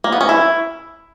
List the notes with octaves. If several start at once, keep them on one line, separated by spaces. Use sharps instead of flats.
A#3
B3
C#4
E4